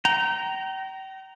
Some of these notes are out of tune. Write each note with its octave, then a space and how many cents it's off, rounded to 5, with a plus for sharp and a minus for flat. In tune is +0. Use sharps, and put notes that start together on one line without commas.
G5 -35 A#5 +0